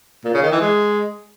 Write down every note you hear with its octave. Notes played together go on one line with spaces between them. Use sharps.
A#2
C#3
D#3
E3
G#3